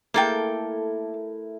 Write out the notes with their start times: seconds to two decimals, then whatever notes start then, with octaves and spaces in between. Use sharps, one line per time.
0.14 A3 A#3 E4 A4 A#4 G5